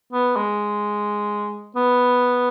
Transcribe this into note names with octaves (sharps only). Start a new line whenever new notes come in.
B3
G#3
B3